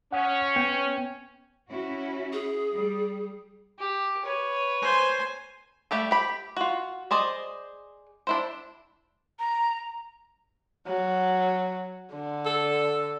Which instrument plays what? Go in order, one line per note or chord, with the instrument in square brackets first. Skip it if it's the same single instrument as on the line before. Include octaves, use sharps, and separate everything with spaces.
[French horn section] C#4 [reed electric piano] F#5 D#6
[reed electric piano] B3 G5 G#6
[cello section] C#4 E4 F#4
[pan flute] G#4
[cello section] G3
[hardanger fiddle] G4
B4 C#5
[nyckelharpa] C5 G#5
[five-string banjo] G3 A3 G4 A4
G4 B5
F4 F#4
G#4 C5 D5 D#5
D4 E4 C5
[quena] A#5
[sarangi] F#3
D3
[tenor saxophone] A4